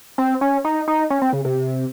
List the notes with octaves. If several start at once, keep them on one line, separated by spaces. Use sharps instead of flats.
C4
C#4
D#4
D#4
C#4
C4
C#3
C3